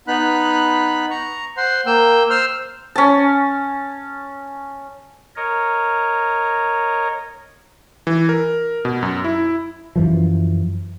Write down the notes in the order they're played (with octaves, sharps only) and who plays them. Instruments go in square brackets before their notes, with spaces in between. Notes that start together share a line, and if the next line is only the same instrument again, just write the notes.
[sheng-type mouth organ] B3 D#4 B5 F#6
A#5 C#6
C5 F#5 C6
A#3 G5 E6
C5 C6 E6 F6
[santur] C#4 A5
[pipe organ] A#4 C#5 D#5
[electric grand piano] E3
A#4
B2
F#2
E4
[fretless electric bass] F#2 E3 F3